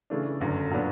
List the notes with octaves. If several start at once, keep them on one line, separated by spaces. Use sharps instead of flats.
C#3 E3 A3 D4
G1 F#2 D3
A#2 F#3 B3 D4